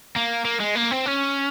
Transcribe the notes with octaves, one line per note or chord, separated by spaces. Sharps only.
A#3
A#3
G#3
A#3
C4
C#4